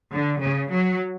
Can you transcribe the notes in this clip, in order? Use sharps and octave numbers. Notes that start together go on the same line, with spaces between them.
D3
C#3
F#3